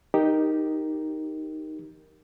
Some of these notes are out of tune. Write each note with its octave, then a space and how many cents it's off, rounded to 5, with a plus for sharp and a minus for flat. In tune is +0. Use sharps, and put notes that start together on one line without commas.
D#4 +0 G4 +0 A#4 +0